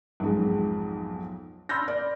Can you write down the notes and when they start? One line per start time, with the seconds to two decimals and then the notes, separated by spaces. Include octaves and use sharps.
0.20 B1 F2 G#2 G#3
1.69 B5 C6 E6 F6 G6 A#6
1.88 D5